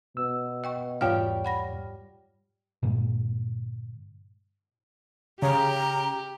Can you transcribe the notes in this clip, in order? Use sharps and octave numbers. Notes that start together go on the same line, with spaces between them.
B2 E6
D#5 G5 C#6
E2 G#2 G3 F4 C#5 F5 G5 F6
F#5 B5 A#6
G2 A#2 D3 G#3
C#3 G4 A#5